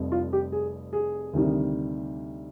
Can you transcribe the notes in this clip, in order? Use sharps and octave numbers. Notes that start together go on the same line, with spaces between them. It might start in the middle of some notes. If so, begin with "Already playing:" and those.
Already playing: F1 F2 C3 G3
F4
G4
G#4
G#4
D2 C3 D#3 G3